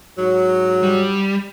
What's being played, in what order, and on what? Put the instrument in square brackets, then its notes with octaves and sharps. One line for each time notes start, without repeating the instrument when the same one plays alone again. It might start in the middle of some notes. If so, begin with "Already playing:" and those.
[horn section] G#2 F#3
[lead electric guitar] G3